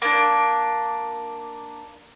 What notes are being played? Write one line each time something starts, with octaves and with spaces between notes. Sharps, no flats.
A#3 D4